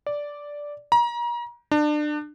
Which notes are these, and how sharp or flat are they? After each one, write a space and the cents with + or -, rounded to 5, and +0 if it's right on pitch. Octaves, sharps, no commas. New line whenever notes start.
D5 -5
A#5 +35
D4 +30